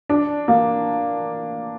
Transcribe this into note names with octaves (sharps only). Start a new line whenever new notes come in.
D4
A#3